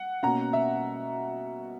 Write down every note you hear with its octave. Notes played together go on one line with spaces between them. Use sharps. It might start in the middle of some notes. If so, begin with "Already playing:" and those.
Already playing: F#5
B2 A#3 C#4 F#5 A#5
E5